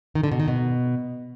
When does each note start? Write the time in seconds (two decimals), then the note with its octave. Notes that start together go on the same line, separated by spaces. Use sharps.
0.15 D#3
0.23 D3
0.32 B2
0.40 D#3
0.48 B2